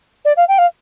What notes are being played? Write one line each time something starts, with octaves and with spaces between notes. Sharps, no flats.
D5
F5
G5
F5